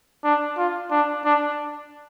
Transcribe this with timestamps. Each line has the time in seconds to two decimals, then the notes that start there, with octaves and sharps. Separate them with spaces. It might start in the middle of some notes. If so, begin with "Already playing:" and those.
0.24 D4
0.58 F4
0.91 D4
1.24 D4